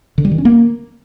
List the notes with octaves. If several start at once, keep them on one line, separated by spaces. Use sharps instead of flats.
D3
G3
D#3
C#4
A#3